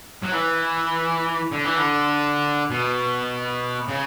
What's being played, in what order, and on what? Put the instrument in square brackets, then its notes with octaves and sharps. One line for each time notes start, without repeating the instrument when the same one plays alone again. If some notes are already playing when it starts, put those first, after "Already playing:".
[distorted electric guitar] F#3
E3
D3
E3
D3
B2
C#3